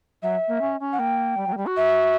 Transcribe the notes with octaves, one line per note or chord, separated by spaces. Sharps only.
F#3 E5
A#3
C#4
C#4
F#5
A#3 G5
G3
F#3
A#3
G3
F#4
E5